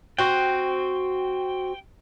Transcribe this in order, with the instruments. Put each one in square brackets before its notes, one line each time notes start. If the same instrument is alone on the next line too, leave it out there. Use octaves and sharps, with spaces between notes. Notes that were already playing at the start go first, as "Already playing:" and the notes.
[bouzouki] C4 F#4 [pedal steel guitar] G5